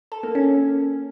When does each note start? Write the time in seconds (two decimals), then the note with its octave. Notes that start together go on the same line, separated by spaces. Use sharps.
0.12 A4
0.23 A#3
0.35 C#4